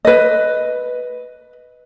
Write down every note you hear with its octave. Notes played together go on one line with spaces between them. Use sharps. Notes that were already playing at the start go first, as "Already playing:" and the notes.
B4 D#5